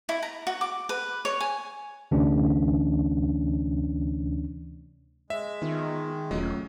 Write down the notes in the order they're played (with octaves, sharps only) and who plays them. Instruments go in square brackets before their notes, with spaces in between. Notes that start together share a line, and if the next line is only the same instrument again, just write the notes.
[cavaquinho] E4
A#5
F#4
D6
B4
C#5
G#5
[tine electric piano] D2 C3 E3 C#4 D4
[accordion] G#3 [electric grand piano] E5
[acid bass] D#3 [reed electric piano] B3 D#4 F4
[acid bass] E1 [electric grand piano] F#3 [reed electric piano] A3 C#4 F4